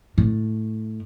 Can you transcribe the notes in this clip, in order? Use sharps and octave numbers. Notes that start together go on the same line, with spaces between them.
A2